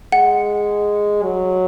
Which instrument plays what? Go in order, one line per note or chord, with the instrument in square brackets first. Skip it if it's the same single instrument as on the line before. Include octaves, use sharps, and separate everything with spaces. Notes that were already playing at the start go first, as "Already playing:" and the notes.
[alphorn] G#3 [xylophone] F#5
[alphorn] F#3